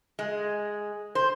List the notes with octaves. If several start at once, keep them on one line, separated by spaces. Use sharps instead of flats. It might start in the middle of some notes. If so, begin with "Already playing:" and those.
G#3
C5